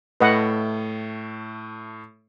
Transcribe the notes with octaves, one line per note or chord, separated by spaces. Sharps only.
A2 A3 B4 D#5 F#5